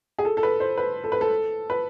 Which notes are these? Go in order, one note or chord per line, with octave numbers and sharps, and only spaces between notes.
G#4
A4
A4
B4
C5
B4
A4
B4
A4
B4